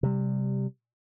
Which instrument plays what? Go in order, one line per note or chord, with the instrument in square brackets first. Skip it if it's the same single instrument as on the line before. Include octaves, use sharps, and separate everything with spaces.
[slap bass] C3 G3